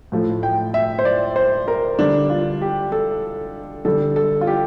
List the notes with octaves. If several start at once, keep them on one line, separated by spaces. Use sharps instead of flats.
A2 F3 A3
G5
E5
C5
D5
C5
A#4
D3 G3 D4
F4
G4
A4
D3 G3 A4
A4
F4
G4